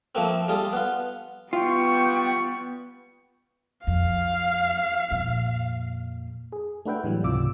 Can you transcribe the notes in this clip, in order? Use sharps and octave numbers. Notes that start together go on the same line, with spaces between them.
F3 A3 A#3 C4
G3 F4 G#4 A4
B3 F4
G3 B3 F4 G5 C#6
F2 F5
F2 A#2
G#4
A3 D4 F#4 B4 E5 G5
A2 E3 F#3 G3
C#2 G#2 C3 F4 D6 E6